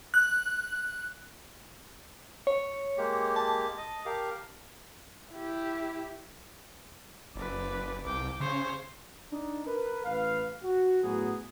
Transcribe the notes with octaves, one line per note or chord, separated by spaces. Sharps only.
F#6
C#5
G#3 A#3 G4
A5
D#5
G4 A#4 F5
E4 G4
F#1 B4 D5
C2 G5 D6
C#3 C5 C#5
D4 D#4
A#4 B4
A1 B4 F5
F#4
A2 F#3 B3 F#4 G#4